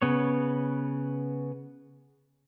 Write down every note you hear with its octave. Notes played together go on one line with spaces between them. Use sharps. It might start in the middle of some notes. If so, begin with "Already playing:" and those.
C#3 B3 C#5